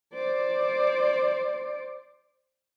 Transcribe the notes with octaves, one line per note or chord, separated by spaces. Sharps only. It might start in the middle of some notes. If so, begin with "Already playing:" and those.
C5 D5